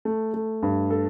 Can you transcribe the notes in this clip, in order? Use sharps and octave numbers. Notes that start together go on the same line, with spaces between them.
A3
A3
G2
A4